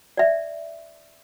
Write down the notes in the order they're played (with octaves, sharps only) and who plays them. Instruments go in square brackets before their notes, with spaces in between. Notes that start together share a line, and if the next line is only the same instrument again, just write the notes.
[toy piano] D5 E5